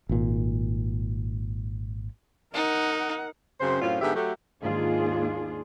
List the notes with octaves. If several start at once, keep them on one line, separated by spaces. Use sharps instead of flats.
G#1 A#2
D#4 A#4 F#5
F#2 C#3 C4 C5
F#2 A2 C4 C#4 F4
G#2 D3 B3 G4 G#4 E5
F#3 A3 G4
D#2 G#2 D4 F4 G#4